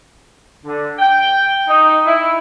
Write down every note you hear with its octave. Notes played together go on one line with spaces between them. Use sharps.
D3
G5
D#4
E4